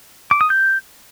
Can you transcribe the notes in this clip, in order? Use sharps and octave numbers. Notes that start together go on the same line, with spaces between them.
D6
D#6
G6